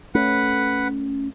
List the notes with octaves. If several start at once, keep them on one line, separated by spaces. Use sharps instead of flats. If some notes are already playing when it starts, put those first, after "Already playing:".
A3 C#4 B4 F#5